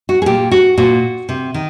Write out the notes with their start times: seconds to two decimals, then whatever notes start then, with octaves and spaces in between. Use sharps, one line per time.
0.09 F#4
0.22 G#4
0.26 A#2 G4
0.51 F#4
0.78 A#2 F#4
1.29 C3
1.54 D#3